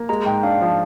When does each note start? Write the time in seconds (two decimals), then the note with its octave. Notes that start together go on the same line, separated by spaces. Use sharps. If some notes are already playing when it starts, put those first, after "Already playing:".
Already playing: A#3
0.09 G#3 A#5
0.26 G#2 G5
0.43 D4 F5
0.61 F3